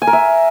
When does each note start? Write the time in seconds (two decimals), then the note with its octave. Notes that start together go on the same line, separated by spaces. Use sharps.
0.02 G#5
0.07 A#4
0.13 E5